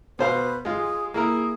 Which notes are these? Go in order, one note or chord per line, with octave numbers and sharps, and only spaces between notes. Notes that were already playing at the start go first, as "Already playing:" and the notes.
B2 B4 C5 F5
G#3 F4 G#4
A#3 E4 G#4 A#4